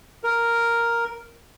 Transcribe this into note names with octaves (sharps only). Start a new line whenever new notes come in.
A#4